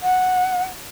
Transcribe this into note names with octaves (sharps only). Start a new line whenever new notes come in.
F#5